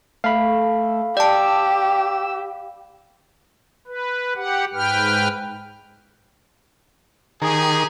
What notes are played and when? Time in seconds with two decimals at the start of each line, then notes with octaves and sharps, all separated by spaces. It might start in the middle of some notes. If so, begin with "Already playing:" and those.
0.24 A3 F5 B5
1.17 G4 D5 A5 E6
3.87 B4
4.36 G4 F#5
4.73 G#2 B4 G5 F6
7.42 D#3 G4 G#4 A#4